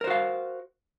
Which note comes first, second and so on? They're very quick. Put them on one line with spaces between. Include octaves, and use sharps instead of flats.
A#4 C5 F#4 F5